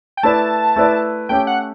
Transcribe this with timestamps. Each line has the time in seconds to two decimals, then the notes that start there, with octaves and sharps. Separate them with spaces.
0.17 G5
0.23 A3 E4 B4 D5 A5
0.76 A3 E4 B4 D5
1.29 A3 C#4 G4 G5
1.47 F#5